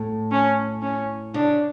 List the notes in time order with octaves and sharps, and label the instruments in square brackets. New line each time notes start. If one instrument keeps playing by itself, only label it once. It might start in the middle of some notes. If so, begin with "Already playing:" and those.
Already playing: [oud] A2
[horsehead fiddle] C#4
C#4
[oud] C#3 [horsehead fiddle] D4